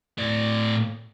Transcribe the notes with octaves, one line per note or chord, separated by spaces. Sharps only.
A2 D5